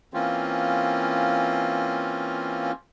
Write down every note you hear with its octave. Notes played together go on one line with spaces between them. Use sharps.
E3 A#3 C4 C#4 F4